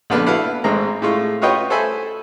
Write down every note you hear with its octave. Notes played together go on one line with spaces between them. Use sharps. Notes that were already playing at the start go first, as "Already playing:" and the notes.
A#1 D3 B3 D4 B4 F6
E4 F#4 A4 B4 F5
G#1 G#2 G#3 C4 A#5
A2 G#3 F4 C#6
F4 F#4 B4 C#5 D#5 G5
A4 C5 E5 G#5 B5